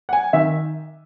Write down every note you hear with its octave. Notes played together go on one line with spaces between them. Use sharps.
F#5
G#5
D#3 E5